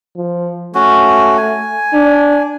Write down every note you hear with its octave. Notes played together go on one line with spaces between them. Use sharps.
F3
A3 C#4 F#4
G#5
D4